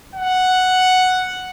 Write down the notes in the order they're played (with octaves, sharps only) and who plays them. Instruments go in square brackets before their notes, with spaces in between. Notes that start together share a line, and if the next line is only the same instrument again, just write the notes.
[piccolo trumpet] F#5